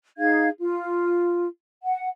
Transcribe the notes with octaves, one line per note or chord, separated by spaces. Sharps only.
D#4 G#4 F5 G#6
F4
F#5